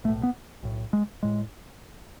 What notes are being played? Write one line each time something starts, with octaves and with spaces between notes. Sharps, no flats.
B1 A2 A3
B3
B1 A2
G#3
A2 G#3